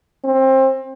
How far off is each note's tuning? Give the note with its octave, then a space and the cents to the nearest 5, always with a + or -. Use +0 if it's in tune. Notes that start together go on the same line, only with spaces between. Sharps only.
C4 +25